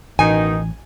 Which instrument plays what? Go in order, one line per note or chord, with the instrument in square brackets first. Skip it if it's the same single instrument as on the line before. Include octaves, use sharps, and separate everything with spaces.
[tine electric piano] A1 [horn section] B2 D#3 D#4 [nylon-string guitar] G#5